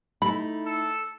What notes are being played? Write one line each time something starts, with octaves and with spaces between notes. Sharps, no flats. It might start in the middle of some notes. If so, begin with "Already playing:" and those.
A3 D#4 E4 B5
A4